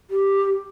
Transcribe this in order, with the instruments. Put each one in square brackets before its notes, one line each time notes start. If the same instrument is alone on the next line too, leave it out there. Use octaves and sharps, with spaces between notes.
[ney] G4